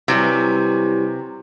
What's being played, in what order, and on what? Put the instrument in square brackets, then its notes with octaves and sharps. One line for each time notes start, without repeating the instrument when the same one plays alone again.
[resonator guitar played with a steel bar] C3 [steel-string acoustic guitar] E3 F#3 G3